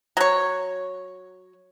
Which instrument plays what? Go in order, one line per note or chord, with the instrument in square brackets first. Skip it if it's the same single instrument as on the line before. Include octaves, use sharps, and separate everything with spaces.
[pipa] F#3 C#5